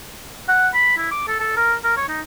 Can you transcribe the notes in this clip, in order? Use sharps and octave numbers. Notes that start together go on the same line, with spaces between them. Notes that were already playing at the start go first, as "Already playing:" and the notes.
F#5
B5
E4
D6
A4
A4
A#4
A#4
C#5
D#4